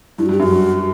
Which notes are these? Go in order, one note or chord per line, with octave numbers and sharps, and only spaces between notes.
G2 E4
F#4
G2
G4
F#2
F#4
G2